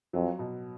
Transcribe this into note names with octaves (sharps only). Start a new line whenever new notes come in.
F2 F#3
B2